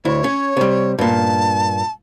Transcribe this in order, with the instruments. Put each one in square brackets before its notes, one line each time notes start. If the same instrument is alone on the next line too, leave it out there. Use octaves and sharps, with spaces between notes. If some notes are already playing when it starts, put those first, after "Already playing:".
[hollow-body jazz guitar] D2 E4 [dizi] C#5
[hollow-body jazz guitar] C#4
C3 G3
[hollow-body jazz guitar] G2 A#2 [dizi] A5